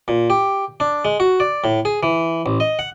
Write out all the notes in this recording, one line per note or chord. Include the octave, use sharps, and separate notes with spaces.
A#2
G4
D4
G#3
F#4
D5
A2
G#4
E3
A1
D#5
F#5